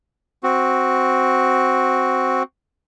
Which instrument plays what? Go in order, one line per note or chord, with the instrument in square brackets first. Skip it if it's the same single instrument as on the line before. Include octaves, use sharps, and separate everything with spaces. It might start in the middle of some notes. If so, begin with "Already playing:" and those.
[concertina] C4 F#4